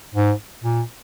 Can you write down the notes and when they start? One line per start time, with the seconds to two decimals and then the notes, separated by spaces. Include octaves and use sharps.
0.14 G#2
0.64 A#2